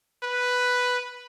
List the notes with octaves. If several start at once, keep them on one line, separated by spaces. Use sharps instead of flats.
B4